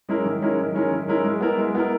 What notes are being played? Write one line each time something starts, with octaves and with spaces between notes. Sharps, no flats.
G#3 C#4 E4 A#4
D#3
G#3 C#4 E4 A#4
D#3
G#3 C#4 E4 A#4
D#3
G#3 C#4 E4 A#4
G#3
B3 E4 A#4
G#3
B3 E4 A#4